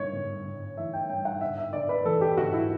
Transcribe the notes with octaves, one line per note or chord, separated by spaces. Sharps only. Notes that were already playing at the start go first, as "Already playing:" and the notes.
Already playing: G1 G2 C#5
G1
G1
E3 E5
G5
G2 G5
F#5
D3 E5
E5
D3 D5
B4
E2 A4
G4
D3 F#4
E4